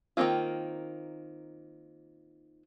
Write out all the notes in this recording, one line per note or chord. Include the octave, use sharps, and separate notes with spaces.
D#3 F#3 A#3 C4 F4